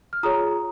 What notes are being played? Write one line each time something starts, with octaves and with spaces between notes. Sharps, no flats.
F6
F4 G#4 C#5 A#5 D#6